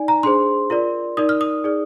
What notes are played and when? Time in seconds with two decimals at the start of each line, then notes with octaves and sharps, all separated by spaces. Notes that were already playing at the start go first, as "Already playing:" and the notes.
Already playing: D#4 D5 G#5
0.08 A#5
0.23 D4 G#4 C5 C6
0.70 F4 A#4 D5
1.17 D#4 A#4 D5 D#6
1.29 F6
1.41 D#6
1.64 D#4 G#4 D5